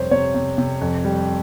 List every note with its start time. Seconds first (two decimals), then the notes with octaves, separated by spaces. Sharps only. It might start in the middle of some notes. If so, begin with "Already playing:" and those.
Already playing: F2 C3 G3 C5 C#5
0.11 C3 C#5
0.34 C3
0.58 C3
0.81 F2
1.05 G3